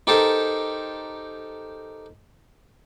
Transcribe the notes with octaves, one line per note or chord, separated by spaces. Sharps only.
D#4 G4 A4 A#4 C5 A5